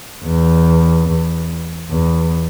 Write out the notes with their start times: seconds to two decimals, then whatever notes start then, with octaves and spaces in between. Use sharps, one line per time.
0.24 E2
1.07 E2
1.90 E2